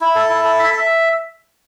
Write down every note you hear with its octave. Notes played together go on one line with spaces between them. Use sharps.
E4
A4
E4
A4
E5
E5